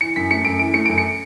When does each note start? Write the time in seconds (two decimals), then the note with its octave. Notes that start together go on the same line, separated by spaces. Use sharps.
0.01 E3 C#7
0.16 F#2 B6
0.31 A3 C#7
0.45 F#2 D7
0.59 E3 D7
0.74 A3 C#7
0.86 F#2 D7
0.98 C#7